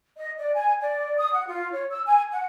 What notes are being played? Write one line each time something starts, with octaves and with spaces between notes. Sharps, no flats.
D#5
D5
G#5
D5
D#6
F#5
F4
C#5
E6
G#5
F#5